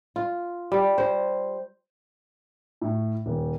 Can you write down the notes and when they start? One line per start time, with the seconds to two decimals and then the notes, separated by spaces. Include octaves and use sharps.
0.16 F4
0.72 G3
0.98 C5
2.81 A2
3.26 D#1